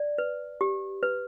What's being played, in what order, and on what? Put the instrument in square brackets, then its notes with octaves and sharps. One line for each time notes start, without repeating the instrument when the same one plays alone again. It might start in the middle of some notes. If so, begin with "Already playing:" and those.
Already playing: [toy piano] D5
B4
G4
B4